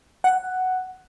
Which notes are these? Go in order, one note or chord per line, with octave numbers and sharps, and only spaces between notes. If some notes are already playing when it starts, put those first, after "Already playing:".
F#5